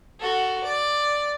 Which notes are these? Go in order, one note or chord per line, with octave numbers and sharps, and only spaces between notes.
F#4 A4
D5